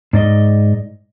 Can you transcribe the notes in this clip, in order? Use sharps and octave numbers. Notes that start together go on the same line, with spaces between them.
G#2 D5 D#5